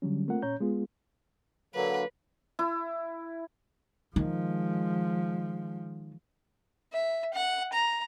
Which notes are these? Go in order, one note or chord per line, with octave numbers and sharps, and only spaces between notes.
D3 F#3 G3 C#4
A3 A#3 C4 F4 A#4 F#5
A#2 C#4 C#5 A#5 G6
G#3 B3 F4 G#4
D3 F#3 A#3 B4
E4
D#3 F3 G#3
E5
F#5
A#5